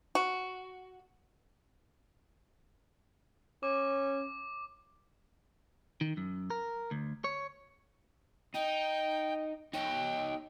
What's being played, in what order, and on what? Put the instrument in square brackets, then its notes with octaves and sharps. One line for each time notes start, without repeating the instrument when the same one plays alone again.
[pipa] F#4
[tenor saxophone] C#4 [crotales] D6
[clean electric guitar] D#3
F#2
A#4
D2
C#5
[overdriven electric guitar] D#4 [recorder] G5
[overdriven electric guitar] D#4 C#5 [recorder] G5